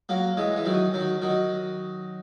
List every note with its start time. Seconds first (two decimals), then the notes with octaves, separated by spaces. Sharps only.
0.09 F#3 A#3
0.37 E3 G#3
0.56 E3
0.65 D#3 F#3
0.94 D#3 F#3
1.22 D#3 F#3